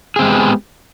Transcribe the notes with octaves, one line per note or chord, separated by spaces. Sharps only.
G#3 B3 C4 G4 G#4